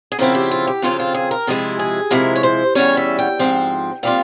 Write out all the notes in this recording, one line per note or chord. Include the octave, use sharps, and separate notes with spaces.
G#4
C#3 F3 C4 E4 A#4
G4
F4
G4
F2 C#3 F3 C4 F4
F4
G#4
A#4
C3 F3 G#3 E4 G#4
G#4
C3 F3 G#3 E4 A#4
C#5
C5
E2 C3 G3 C#4 C#5
E5
G5
G#2 F3 C4
A#2 G3 C4 F4 F5